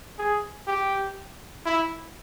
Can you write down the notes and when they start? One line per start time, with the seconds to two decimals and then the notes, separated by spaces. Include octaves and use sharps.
0.19 G#4
0.67 G4
1.66 E4